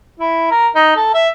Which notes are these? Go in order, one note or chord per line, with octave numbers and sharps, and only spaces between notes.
E4
A#4
D#4
A4
E5